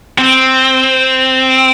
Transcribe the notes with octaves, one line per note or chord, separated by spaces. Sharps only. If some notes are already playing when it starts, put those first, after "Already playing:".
C4